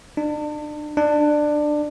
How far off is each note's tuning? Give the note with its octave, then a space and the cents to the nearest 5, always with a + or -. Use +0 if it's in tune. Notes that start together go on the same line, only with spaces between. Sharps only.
D4 +35
D4 +20